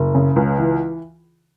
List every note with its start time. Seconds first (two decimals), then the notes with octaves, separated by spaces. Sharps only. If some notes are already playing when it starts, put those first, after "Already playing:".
Already playing: F#1
0.15 C#3
0.36 C#2
0.58 E3